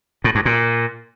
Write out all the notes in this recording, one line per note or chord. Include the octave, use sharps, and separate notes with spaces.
A2
G2
A#2